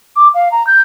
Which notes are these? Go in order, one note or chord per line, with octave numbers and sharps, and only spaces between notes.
D6
F5
A#5
G6